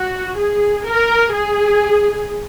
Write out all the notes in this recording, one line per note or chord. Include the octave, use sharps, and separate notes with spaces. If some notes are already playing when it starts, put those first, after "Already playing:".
Already playing: F#4
G#4
A#4
G#4